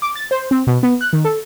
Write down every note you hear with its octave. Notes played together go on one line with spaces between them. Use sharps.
D6
A6
C5
C4
B2
B3
F#6
D#3
A4